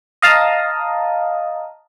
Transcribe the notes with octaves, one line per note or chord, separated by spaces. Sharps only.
D#5 F5 A5 A#5 D#6